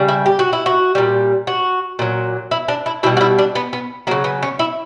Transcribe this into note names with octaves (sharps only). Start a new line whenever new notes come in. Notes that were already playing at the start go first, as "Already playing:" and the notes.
Already playing: C#3 G3
E4
G4
F#4
E4
F#4
A#2 G3
F#4
A#2 F#3
E4
D4
E4
B2 G3 E4
F#4
E4
D4
B3
B3
C#3 F#3 A#3
B3
C#4
E4